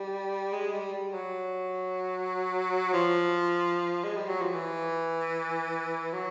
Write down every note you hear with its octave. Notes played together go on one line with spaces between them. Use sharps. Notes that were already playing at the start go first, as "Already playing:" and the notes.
Already playing: G3
G#3
G3
G3
F#3
F3
G#3
G3
F#3
F3
E3
F#3